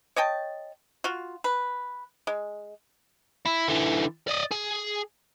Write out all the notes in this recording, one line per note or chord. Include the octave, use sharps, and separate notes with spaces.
C#5 D#5 G5 A5
F4 F#4
B4
G#3
E4
D3 E3
D5 D#5
G#4